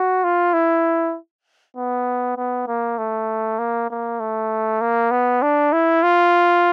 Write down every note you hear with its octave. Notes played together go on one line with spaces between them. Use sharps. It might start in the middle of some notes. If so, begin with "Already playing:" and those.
Already playing: F#4
F4
E4
B3
B3
A#3
A3
A#3
A#3
A3
A#3
B3
D4
E4
F4